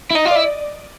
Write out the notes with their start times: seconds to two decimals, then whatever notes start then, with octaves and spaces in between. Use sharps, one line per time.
0.11 E4
0.15 D#4 D#5
0.25 F4
0.31 E4 D5